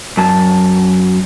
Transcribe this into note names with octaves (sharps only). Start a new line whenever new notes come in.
F#2 A5